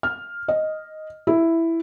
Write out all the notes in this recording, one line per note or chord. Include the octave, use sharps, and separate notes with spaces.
F6
D#5
E4